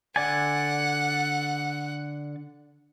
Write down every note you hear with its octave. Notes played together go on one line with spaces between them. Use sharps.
D3 D5 F#5 G#5